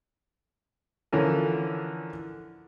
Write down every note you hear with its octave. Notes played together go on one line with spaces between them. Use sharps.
D3 E3 F3 C#4 A#4